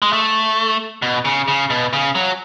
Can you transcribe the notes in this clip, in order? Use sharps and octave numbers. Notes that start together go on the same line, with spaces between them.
G#3
A3
B2
C#3
C#3
B2
C#3
F#3